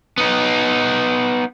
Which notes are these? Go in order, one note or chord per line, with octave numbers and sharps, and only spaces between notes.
B3 D#4